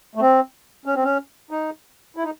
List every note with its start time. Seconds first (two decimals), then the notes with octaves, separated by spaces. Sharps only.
0.15 A3
0.21 C4
0.86 C#4
0.95 C4
1.03 C#4
1.51 D#4
2.17 E4
2.23 D#4